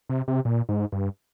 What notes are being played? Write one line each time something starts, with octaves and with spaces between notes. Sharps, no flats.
C3
C3
A#2
G#2
G2